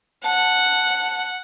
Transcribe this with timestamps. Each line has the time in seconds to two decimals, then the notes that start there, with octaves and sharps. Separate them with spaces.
0.24 F#5 A5